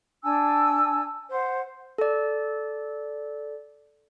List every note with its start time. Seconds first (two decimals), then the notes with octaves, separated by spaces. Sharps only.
0.23 D4 G#5 A5 E6
1.30 C5 F#5
1.98 A4 D5